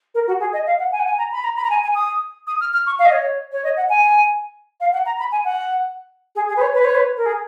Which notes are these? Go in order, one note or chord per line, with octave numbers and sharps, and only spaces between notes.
A#4
F#4
G#4
D#5
F5
F#5
G#5
F#5
G#5
A#5
B5
A#5
B5
A#5
G#5
G#5
D#6
D#6
F6
F6
C#6
F5
D#5
C#5
C#5
D#5
F#5
G#5
F5
F#5
A#5
B5
G#5
F#5
G#4
G#4
B4
C#5
B4
C#5
B4
A#4
G#4